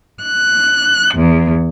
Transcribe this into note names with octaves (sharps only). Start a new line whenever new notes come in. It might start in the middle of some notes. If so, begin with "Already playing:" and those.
F#6
E2